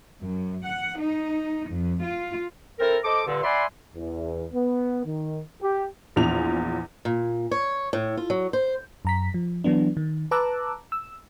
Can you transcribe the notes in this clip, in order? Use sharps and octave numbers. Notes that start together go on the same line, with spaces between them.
F#2
F#5
D#4
F2
F4
C4 E4 A4 A#4
A4 C5 D#5 D6
G2 A#2 D3
D5 E5 F#5 G#5 B5 C6
E2
B3
D#3
G4
A#1 E2 F4 F7
A#2
C#5
A2
F4
F#3
C5
F#2 A#5 B6
F3
E3 F#3 B3 D4
D#3
B4 A5 A#5 D6 E6 F#6
E6